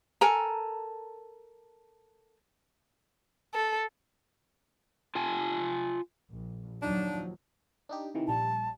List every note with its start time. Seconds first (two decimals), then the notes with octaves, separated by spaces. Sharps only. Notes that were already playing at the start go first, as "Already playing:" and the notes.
0.21 A4 A#4 G#5 A#5
3.54 A4
5.15 F4 G#5 A5
6.32 A#1
6.82 D#2 F3 F#3 D4 D#4
7.89 D4 D#4 G4
8.15 C3 D#3 E3
8.28 A#1 G3 A5